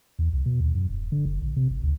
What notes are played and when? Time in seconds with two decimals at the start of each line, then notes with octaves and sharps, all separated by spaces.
0.19 E2
0.33 C2
0.46 B2
0.60 D#2
0.75 F#2
0.89 D#1
1.12 D3
1.25 F#1
1.42 A#1
1.56 C3
1.70 G#1
1.83 D2